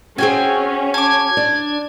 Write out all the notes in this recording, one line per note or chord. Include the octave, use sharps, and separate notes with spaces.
C4 C#4 F#4 G#4 G5 G#5
A5 D6 G#6
D4